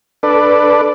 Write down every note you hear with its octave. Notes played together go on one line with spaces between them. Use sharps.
D4 A4 B4 D5